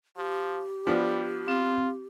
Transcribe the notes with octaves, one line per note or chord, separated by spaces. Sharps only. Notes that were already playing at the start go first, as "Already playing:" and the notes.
F3 G4
F3 G3 B3 D4
C4 F4